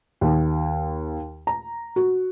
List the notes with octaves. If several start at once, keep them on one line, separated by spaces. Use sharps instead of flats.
D#2
A#5
F#4